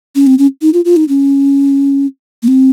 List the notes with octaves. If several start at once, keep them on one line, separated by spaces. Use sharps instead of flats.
C#4
C4
C#4
D#4
F4
F4
D#4
C#4
A#3
C4